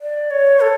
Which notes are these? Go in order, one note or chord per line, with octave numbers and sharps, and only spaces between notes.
D5
C#5
A4